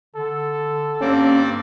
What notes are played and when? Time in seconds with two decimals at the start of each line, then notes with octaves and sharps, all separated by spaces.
0.16 D3 A4
1.01 G2 A#3 C4 C#4 D5